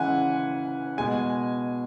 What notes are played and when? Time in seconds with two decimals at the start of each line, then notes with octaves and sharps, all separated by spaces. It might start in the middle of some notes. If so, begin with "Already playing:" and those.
Already playing: C#3 E3 G#3 F#5 G#5
0.98 B2 G#3 G#5